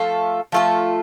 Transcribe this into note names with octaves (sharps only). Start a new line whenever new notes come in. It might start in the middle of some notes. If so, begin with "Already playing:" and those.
Already playing: F3 A3 F4 A4
F3 A3 F4 A4